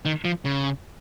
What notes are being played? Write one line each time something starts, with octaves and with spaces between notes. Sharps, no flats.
D#3
F3
C#3